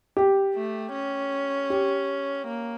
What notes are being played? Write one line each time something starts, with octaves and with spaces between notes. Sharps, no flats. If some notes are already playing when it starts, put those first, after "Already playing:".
G4
A3
C#4
G4
A#3